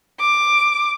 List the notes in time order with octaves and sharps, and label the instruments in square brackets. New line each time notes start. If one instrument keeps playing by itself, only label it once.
[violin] D6